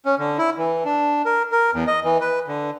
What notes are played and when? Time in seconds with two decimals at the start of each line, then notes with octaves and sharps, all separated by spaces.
0.05 C#4
0.18 D3
0.38 E4
0.58 E3
0.85 D4
1.25 A#4
1.52 A#4
1.74 E2
1.87 D#5
2.04 E3
2.21 B4
2.47 D3